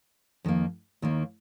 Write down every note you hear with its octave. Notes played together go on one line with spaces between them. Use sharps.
F2 D#3 A#3
D#2 D#3 A#3